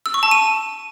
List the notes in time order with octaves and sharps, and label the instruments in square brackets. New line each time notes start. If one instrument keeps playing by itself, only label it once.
[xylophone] E6
C#6
A5
D#7